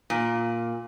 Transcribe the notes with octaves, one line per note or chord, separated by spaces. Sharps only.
A#2